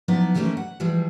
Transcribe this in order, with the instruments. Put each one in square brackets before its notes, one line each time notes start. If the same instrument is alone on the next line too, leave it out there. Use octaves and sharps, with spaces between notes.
[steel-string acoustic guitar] F3 F#3 B3 D#4 E4 D5
D#3 E3 A3 A#3 C#4 E4
F#5
E3 F3 G3 G#3